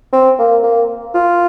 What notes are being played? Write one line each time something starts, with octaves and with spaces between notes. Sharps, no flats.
C4
A#3
A#3
F4